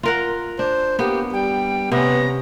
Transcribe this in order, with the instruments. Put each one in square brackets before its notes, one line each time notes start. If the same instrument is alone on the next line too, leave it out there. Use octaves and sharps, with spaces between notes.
[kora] F4 A#4 F#5
[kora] D4 [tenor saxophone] C5
[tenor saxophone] A#3 [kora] B3 [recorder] G4
[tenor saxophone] G3 [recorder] G5
[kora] C3 C#4 [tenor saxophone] B3 [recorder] A#5